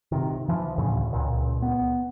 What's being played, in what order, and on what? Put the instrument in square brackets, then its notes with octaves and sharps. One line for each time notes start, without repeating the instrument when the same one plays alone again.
[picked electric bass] C3 D#3
E3 F3
D2 A2 C#3
C#2 A#2
B3